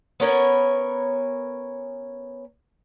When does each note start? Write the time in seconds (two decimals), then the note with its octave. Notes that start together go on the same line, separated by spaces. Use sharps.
0.20 B3 C#4 A#4 C#5